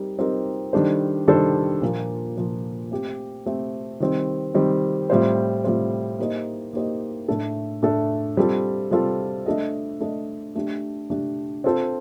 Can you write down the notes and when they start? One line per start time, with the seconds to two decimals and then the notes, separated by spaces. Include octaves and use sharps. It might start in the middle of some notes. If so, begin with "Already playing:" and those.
Already playing: G3 C4 D#4 G4 A#4
0.18 G3 C4 D#4 G4 A#4
0.73 D#3 G3 D4 A4 C5
1.28 D#3 G3 D4 A4 C5
1.82 A#2 F3 A#3
2.37 A#2 F3 A#3
2.91 A3 C4 G4
3.46 A3 C4 G4
4.00 D#3 G3 C4
4.54 D#3 G3 C4
5.10 A2 G3 C4 F4 C5
5.64 A2 G3 C4 F4 C5
6.19 A#3 D#4 G4 C5 D#5
6.73 A#3 D#4 G4 C5 D#5
7.28 A2 A3 D4 A4
7.82 A2 A3 D4 A4
8.37 G3 C4 F4 A4
8.91 G3 C4 F4 A4
9.46 A3 D4 A4 D#5
10.00 A3 D4 A4 D#5
10.55 A3 D4 G4
11.10 A3 D4 G4
11.64 C4 F4 A4 C5